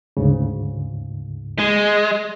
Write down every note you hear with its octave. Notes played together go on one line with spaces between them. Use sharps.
D2 G#2 C#3
G#3